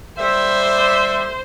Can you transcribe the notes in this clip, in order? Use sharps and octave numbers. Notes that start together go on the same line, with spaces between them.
G3 C5 E5